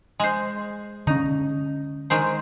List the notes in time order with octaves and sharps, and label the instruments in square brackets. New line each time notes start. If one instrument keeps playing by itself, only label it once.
[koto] G#3 C5
[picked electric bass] D3 C#4 [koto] D#4
[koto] D#3 G#3 C5